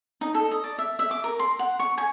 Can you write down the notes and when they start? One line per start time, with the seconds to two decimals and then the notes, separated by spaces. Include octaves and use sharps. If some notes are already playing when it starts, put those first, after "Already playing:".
0.21 D#4
0.34 A4
0.51 D#5
0.64 D5
0.79 E5
0.99 E5
1.11 D6
1.24 A#4
1.39 C6
1.59 F#5
1.79 C#6
1.98 G#5